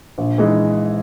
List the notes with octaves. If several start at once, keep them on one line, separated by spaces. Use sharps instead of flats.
A#1
E3 G#3 D#4